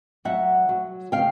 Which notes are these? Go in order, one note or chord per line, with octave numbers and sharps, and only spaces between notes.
F#3 E5 F#5
F#3
C#3 F5 G5